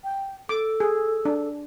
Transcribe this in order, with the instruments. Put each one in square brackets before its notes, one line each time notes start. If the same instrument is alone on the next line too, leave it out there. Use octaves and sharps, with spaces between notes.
[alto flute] G5
[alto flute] A4 [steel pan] D6
[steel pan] G#4
D4